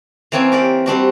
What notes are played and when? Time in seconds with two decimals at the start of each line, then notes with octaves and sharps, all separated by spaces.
0.32 E3 A#3 C4 C#4 G#5 A5
0.52 G4 A#4 D5 G5
0.86 G3 C4 D4 F#4